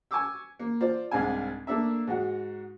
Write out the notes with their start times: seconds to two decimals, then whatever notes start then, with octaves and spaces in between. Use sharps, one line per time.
0.11 G#5 C#6 D6 E6
0.59 A#3
0.80 F4 C5 D5
1.11 C2 G#2 D4 F5 G#5
1.67 A3 A#3 D4 E5
2.07 G#2 F#4